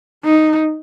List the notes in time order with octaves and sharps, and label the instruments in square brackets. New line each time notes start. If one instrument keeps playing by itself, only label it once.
[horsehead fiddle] D#4